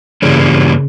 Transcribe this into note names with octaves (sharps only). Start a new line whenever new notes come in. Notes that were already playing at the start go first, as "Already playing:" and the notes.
G2 C#3 E3 G3 A#3 C#4